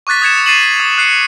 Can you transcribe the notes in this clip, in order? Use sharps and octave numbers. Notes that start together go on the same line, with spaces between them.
C#6 D6 F#6 A6 B6
D#6 G#6 C#7 E7
A6 C7 D#7 E7 F#7
D#6
F#6 C7 C#7